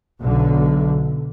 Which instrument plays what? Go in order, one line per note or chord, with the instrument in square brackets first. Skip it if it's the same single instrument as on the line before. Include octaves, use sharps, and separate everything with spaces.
[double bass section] B1 D3